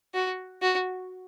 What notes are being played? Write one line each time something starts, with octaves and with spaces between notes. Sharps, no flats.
F#4
F#4